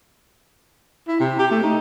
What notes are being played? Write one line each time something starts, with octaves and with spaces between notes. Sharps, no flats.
E4
C3
G4
A3
D#4